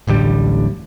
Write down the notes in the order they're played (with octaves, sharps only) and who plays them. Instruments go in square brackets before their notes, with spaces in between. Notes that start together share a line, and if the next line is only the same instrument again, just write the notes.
[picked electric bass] D1 A1 D3 G3